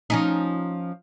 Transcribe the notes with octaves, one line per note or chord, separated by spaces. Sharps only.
F3 C#4 D#4